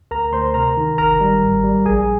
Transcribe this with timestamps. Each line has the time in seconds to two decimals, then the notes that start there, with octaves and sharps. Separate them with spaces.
0.11 D2 A#4 A#5
0.32 D2 C5 C6
0.54 C3 A#4 A#5
0.77 D#3
0.98 G1 A#4 A#5
1.21 G3
1.42 G#1
1.64 G3
1.86 A#1 G#4 G#5